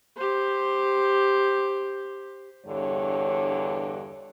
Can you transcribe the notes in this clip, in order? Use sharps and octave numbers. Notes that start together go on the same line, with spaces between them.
G4 C5
E2 G2 D3 C#5